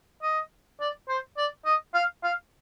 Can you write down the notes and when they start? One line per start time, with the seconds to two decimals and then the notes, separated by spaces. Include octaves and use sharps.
0.22 D#5
0.80 D5
1.08 C5
1.37 D5
1.66 D#5
1.94 F5
2.23 F5